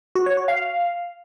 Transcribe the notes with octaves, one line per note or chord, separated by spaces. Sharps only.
F#4
C#5
F#4
F5